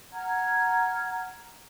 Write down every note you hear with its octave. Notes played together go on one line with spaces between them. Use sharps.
F#5 A#5 F6 G#6